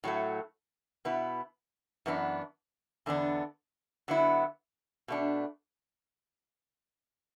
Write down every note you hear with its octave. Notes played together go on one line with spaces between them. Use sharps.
A2 F#3 A3
B2 B3 E4
F#2 E3 B3 D4
E2 D3 B3 D4
D3 F#3 B3 E4
B2 A3 D4